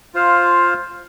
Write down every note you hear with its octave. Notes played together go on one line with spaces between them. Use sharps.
F4 C5 F5